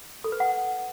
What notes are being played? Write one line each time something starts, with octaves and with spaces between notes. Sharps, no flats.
A4
B4
F#5